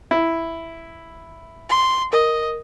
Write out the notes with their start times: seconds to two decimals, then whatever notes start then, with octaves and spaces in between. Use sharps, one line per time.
0.11 E4
1.69 C6
2.13 A#4 D#5